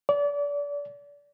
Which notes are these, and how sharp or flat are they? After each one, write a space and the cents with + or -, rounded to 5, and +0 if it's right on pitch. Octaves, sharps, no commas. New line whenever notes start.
D5 -30